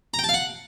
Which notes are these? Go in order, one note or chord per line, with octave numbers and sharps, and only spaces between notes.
A#5
G5
A5
F5
F#5